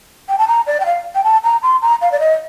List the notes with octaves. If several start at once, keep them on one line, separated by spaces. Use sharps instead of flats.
G5
A5
A#5
D5
G5
F5
G5
A5
A#5
C6
A#5
F5
D5
D#5